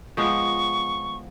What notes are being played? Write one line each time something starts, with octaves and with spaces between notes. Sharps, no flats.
F3 G#3 B3 C#6